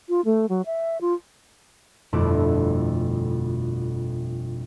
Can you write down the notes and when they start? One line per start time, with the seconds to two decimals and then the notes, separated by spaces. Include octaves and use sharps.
0.09 F4
0.25 A3
0.49 F#3
0.66 E5
1.01 F4
2.13 G1 F2 B2 A3 E4 D6